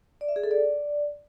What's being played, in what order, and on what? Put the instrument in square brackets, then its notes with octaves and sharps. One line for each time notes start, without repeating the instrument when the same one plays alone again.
[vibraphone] D5
E5
G#4
A4
D5